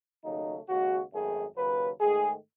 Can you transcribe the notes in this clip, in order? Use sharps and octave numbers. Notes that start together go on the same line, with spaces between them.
D#2 C#3 F#3 A3 D#4
D#2 C#3 G#3 F#4
G#1 F#2 D#3 A3 G#4
D#2 C#3 F#3 B4
G#2 D#3 A3 G#4